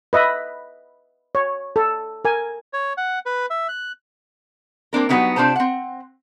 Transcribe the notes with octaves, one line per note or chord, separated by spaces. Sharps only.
B4 D#5 E5 B5
C#5
A4
A#4 G#5
C#5
F#5
B4
E5
F#6
A#3 C4 D4 A#4
F#3 G3 B3 C#4 D#4 F#4
C3 D4 F4 G4 C5 A#5
C4 F#5